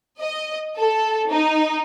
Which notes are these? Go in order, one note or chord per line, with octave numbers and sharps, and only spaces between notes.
D#5
A4
D#4